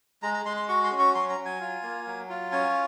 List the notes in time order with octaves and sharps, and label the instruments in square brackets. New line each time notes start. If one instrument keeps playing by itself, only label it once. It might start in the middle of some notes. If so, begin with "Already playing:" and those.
[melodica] G#3 A#5
A#5
G#3 C6
C6
F#4 C#6
C6
C#4
C#6
F#3 C6
A#5
F#3
G#5
F4
A#3
F#3
F4
C#4 G#5